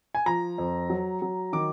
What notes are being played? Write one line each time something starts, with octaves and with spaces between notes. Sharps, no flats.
G#5
F3 A#5
F2
F#3
F#3
D#3 D6